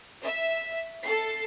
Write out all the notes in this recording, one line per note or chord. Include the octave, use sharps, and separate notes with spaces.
E5
A4 C7